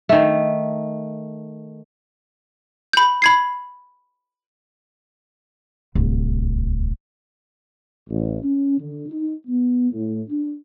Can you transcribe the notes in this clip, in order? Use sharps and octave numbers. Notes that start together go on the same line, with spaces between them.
D#3 A3
B5 G6
B5 G#6 C7
D1 C2
A1
C#4
D3
D#4
B3
A2
D4